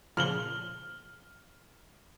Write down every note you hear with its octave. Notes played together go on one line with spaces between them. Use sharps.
A#2 C#3 F3 F6 F#7 G7